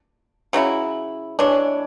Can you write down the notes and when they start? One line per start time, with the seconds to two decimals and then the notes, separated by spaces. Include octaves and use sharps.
0.53 C#3 F#3 C#4 E4
1.39 E3 G#3 D4 C#5